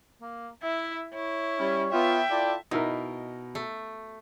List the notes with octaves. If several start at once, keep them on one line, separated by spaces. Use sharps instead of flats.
A#3
E4 E5
E4 C#5
G3 C#4
B3 F4 E5 G5
E4 F4 A4 D5
B2 D#4 E4 A#4
A3